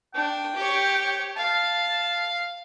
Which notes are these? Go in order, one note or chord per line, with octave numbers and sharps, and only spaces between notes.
D4 G5
G4 C#5
F5 A5